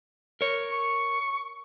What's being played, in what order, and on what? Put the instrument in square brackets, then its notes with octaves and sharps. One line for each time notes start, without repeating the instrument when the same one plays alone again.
[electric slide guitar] A#4 C#5
[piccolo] C#6